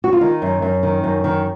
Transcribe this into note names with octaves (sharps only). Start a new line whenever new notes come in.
F#4
F4
D#3 D#4
F#2
F#2
D#3
F#2
D#3